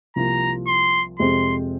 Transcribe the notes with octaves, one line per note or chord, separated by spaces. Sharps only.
C2 C3 F3 A#3 F4 A#5
C6
F2 C3 G#3 C4 C6